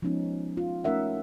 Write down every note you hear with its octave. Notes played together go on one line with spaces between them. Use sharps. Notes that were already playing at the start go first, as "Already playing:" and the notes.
F3 G#3 B3 C#4 D#4
F4
A3 C#4 D#4 A#4 E5 F#5